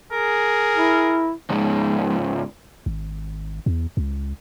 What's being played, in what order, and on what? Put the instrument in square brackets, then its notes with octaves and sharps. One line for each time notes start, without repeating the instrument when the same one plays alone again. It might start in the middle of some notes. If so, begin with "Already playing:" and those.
[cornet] G#4 [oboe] A#4
[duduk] E4
[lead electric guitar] C#2 G#2
[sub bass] G#1
E2
C#2